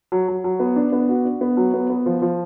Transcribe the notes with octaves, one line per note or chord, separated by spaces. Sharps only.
F#3
F#3
F#3
B3
D4
B3
F#4
D4
B3
F#3
B3
B3
F3
F3